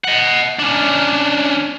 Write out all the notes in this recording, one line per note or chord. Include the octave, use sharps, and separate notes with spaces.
D#5 F#5
C#4 D4